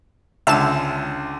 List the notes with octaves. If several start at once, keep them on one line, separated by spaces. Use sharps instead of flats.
C#2 D3 E5 A5 E7